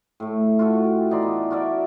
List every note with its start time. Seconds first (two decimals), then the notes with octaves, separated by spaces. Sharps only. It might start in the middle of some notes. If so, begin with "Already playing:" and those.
0.20 A2 A3
0.59 F4 F#4 A4
0.84 G5
1.10 E3 D#4 D5 C6
1.22 B3
1.50 F#4 A#4 D5 E5